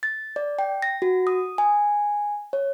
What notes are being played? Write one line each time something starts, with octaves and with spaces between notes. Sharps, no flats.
A6
D5
G5
A#6
F#4
D#6
G#5
C#5